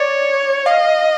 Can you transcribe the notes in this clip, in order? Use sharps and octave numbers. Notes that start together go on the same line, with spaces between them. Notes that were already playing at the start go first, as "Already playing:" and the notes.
Already playing: C#5 D5
D#5 F5